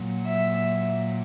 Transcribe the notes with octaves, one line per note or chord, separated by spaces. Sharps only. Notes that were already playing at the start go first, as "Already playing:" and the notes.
Already playing: A#2 F#3
E5